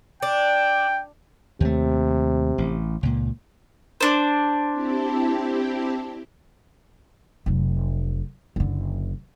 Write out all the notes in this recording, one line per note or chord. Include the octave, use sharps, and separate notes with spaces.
D4 G5
D#2 C3 A3
A1
C#2 A#2
D4 C5
C4 E4 G4
F1 F#3
F#1 D3